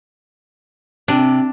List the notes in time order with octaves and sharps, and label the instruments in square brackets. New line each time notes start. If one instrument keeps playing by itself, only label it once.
[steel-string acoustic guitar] C3 [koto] D4